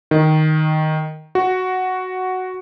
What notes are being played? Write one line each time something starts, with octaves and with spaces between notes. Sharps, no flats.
D#3
F#4